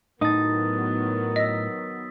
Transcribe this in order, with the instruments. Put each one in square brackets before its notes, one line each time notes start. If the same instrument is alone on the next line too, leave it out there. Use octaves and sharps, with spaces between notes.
[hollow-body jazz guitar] A2 D#4 [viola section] D#3 F#3 B3 [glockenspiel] D#6 A6
[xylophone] D#5 [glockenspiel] E6 B6